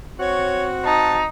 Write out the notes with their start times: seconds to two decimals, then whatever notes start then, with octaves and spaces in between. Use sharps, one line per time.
0.20 C4 F#4 C#5
0.85 D#4 A5